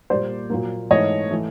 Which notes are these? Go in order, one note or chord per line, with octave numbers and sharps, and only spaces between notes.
A#2 G3 A#3 C5 D5
A#2 F#3 A#3
G#2 E3 A3 C#5 D#5
E3 A3